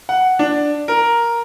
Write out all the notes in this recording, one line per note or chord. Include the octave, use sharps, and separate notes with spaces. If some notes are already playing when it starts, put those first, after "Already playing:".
F#5
D4
A#4